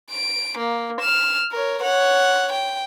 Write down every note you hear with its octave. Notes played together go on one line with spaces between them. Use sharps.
D7
A#3
F6 E7
A#4 C#5
C#5 F#5
G5